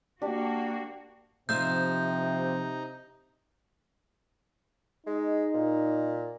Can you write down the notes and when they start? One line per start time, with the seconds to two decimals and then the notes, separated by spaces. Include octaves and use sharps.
0.22 A#3 D4 F#4 G4
1.49 C3 F3 D#4 F4 E5 G6
5.07 G#3 D#4
5.54 A#2